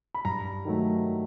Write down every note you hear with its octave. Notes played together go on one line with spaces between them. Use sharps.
B5
G2 A#5
D#3 F#3 A3